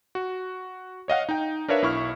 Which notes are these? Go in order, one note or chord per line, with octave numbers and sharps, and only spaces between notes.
F#4
C#5 D#5 F5 F#5
D#4 G5
D4 A#4 B4 C#5 E5 F5
B1 E4 C#6 F6